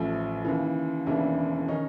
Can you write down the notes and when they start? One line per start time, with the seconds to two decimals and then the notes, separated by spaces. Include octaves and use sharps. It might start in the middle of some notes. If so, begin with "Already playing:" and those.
Already playing: A1 A2 F3 E4
0.45 D#2 C#3 E3
1.06 E1 D#2 C#3 E3 D4 E4
1.68 D#3 C#4 D#4